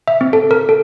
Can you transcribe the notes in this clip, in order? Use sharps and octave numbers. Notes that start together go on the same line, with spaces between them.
E5
C4
A4
A#4
A4